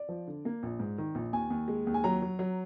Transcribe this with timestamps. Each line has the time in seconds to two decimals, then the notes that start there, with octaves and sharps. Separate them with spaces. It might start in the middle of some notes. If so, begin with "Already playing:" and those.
Already playing: D5
0.09 F3
0.28 D3
0.45 A#3
0.63 A#1
0.80 G#2
0.98 D#3
1.15 A#1
1.33 D#2 G#5
1.50 D#2
1.68 G#3
1.87 D#2
1.94 G#5
2.04 F#3 A#5
2.22 F#3
2.39 F#3